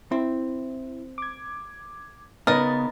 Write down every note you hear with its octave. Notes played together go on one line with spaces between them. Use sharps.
C4 E4
D6 G#6
C#3 B3 D#4 A#4 B4 D#5 A6